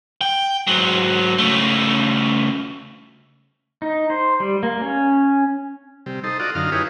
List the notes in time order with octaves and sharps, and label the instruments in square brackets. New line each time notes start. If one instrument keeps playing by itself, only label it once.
[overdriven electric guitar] G5
G#2 F#3
C#3 A3
[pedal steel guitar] D#4
C5
G3
A#3
C#4
[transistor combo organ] C3 G3
D#4 A4 C5
F4 F#4 A4 D5 D#5
F#2 D3 D#4 F4 F5
D#4 E4 G4 G#4 B4 C#5